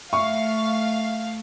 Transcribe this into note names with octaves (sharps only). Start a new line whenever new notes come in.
A3 E5 F5 C#6